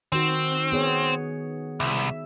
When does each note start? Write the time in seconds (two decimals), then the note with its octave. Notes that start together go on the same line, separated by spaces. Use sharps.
0.12 D#3 C4 F#4
0.72 B3 G#4 C#5
1.80 C2 E5